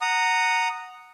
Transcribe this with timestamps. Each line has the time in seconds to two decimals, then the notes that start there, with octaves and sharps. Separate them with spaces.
0.01 F#5 A#5 D#6